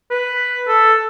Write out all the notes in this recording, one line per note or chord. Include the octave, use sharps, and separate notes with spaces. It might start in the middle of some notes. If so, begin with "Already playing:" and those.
B4
A4